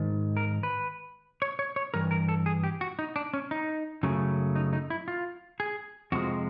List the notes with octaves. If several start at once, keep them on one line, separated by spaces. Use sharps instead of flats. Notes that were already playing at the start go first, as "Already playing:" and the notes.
Already playing: G#2 D#3
A#4
B4
C#5
C#5
C#5
G2 E3 A#4
A#4
A4
G#4
G4
F#4
D#4
D4
C#4
D#4
F#2 C#3 F#3 A3
D#4
D#4
E4
F4
G#4
F2 C3 F3 G#3 F#4